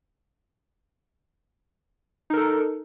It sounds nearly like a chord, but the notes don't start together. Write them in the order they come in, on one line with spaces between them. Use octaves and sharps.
D#4 A#4 A4